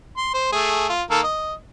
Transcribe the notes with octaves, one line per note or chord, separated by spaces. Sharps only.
C6
C5
A3 G#4
F4
D#3 A#3 A4
D#5